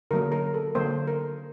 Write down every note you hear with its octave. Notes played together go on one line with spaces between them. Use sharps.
D3 F#3 A#3 A#4
A#4
A4
D3 F#3 A#3 C5
A#4